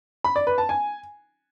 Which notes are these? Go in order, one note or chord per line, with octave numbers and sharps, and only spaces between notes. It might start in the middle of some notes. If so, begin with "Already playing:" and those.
B5
D5
B4
A5
G#5